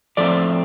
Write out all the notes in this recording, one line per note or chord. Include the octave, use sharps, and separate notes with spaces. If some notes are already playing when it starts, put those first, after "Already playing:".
A2 F3 A3 C4 D5